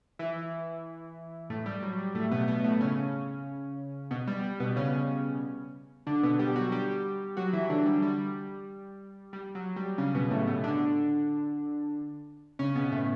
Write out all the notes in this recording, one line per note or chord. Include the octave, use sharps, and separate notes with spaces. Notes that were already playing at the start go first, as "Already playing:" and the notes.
E3 E4
A2 A3
G3
F#3
G3
A2 A3
B2 B3
B2 B3
B3
A2 A3
C#3 C#4
B2 B3
G3
G3
B2 B3
C#3 C#4
D3 D4
B2 B3
G3 G4
F#3 F#4
G3 G4
F#3 F#4
E3 E4
D3 D4
G3
G3
G3
F#3
G3
C#3 C#4
B2 B3
A2 A3
B2 B3
D3 D4
C#3 C#4
B2 B3
A2 A3